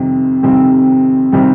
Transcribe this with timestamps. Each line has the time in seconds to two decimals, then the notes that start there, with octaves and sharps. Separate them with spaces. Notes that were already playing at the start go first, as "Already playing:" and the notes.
Already playing: F2 C3 D#3 G3 C4
0.43 F2 C3 D#3 G3 C4
1.32 C3 D#3 G3 C4